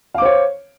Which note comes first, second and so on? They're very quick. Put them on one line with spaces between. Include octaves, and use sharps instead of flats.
F5 D6 C5 C#5